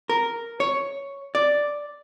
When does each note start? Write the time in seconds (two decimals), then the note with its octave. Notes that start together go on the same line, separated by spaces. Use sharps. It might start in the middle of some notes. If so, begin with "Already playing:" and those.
0.09 A#4
0.60 C#5
1.35 D5